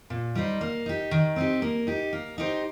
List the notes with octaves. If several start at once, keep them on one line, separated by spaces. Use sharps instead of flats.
A#2
G3 D#4 C5
A#3
D#4 G4
D#3
C4 D#4 G4
A#3
D#4 G4
A#3
D#4 G4 C5